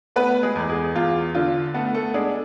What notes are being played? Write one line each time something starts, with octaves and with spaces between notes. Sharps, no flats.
A3 B3 B4
G#3 G#4
E2
G#3 G#4
E2 F4
D3 F4
A3 B3 A4
A3 A4
G#3 D4 G#4